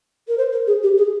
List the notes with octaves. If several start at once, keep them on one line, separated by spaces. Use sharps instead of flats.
A#4
C5
A#4
G#4
G4
G#4